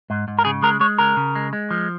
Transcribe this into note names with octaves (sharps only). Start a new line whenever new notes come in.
G#2
G#2
A#4
C#3 G#4
G#3 A#4
G#3 C#5
C#3 A#4
C#3
G#3
G#3
F3